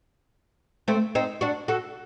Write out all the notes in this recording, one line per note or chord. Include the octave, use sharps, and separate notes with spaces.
A3 C4
C4 D#4
D4 F#4
F#4 A4